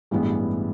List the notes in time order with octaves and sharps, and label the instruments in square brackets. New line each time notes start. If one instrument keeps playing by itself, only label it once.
[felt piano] A1 G2 E3 G#3 B3